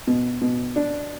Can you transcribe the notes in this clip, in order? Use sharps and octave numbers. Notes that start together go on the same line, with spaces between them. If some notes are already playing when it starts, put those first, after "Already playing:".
B2
B2
D4